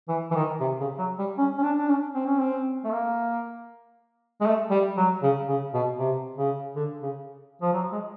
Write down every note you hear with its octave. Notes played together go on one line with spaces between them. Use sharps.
E3
E3
D#3
C3
C#3
F#3
G3
C#4
C#4
D4
D4
C#4
C4
C#4
C4
A3
A#3
G#3
A3
G3
F#3
C#3
C#3
B2
C3
C#3
D3
C#3
F3
F#3
G#3